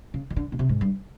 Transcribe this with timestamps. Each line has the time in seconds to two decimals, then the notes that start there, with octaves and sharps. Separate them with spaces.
0.14 C#3
0.30 D#3
0.36 D3
0.52 B2
0.59 C3
0.69 G#2
0.81 G2